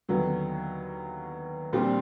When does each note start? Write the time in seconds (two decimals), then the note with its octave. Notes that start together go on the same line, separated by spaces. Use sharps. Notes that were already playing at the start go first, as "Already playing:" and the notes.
0.09 D#2 D3 F#3 B3
1.73 A#1 A#2 G3 C4